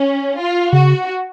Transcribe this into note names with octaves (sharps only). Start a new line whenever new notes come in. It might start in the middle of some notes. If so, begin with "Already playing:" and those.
Already playing: C#4
F4
C#3 F#4